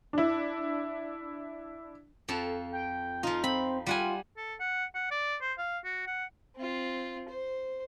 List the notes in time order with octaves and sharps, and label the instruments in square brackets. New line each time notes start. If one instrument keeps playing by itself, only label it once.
[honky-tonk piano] D4 E4
[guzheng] F2 F3 A4
[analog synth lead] G5
[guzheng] F3 D#4 [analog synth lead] F4
[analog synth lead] C4 [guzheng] B5
[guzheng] G3 F#5 G#5 [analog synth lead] F4
[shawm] A4
F#5
F#5
D5
C5
F5
F#4
F#5
[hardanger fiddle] C4 F4
C5